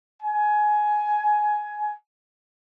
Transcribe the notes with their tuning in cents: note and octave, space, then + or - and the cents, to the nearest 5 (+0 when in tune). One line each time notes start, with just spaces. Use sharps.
G#5 +15